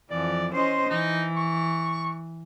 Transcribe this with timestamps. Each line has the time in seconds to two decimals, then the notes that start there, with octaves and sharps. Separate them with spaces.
0.10 F2 E3 F3 D5
0.53 C#4 C5 D#5 C6
0.90 E3 D#4
1.36 C#6